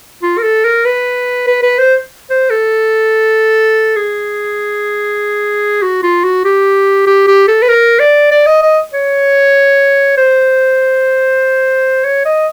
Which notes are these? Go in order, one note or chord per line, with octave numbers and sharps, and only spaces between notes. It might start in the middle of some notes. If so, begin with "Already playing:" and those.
F4
A#4
A4
A#4
B4
B4
B4
C5
C5
A4
G#4
F#4
F4
F#4
G4
G4
G4
A4
B4
A#4
D5
D5
D#5
D#5
C#5
C5
C#5
D#5